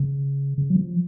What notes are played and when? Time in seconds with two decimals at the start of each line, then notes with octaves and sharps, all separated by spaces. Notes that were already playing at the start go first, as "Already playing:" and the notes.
Already playing: C#3
0.58 C#3
0.70 F#3
0.76 F3